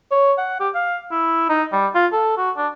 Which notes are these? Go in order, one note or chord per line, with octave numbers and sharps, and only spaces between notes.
C#5
F#5
G4
F5
E4
D#4
G3
F4
A4
F#4
D4